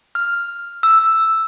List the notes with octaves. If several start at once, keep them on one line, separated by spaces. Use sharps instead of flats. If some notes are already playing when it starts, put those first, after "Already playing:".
F6
E6